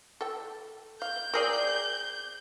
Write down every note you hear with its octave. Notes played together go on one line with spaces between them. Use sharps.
A4 G5
F5 G6
C4 G#4 A#4 D5